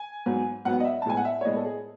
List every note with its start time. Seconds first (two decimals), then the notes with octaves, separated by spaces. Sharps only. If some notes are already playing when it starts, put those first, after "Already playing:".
Already playing: G#5
0.26 G#2 F#3 B3
0.65 G#2 F#3 B3 F#5
0.80 D#5
0.85 E5
1.02 A5
1.05 A2 G#3 B3 G#5
1.17 F#5
1.25 E5
1.41 C#5
1.45 A2 G#3 B3 D#5
1.57 A4
1.65 G#4